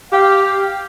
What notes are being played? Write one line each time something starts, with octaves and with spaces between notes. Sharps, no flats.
G4 F5